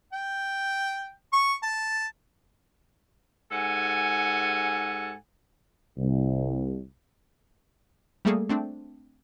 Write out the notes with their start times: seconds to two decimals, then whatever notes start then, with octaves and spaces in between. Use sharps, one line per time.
0.13 G5
1.33 C#6
1.63 A5
3.51 G#2 G4 A4 F#5 G#5
5.97 C2
8.25 G3 A3 A#3 G#4 A4
8.49 A3 C4 D4